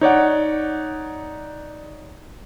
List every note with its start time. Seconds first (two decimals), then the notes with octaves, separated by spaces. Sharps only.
0.01 D#4 C#5 D5 F#5